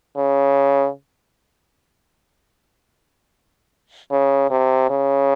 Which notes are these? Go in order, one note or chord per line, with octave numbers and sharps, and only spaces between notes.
C#3
C#3
C3
C#3